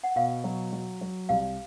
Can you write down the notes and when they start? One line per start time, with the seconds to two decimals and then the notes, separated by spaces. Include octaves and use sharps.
0.04 F#5
0.16 B2 F5
0.44 F#3
0.73 F#3
1.01 F#3
1.29 C2 F5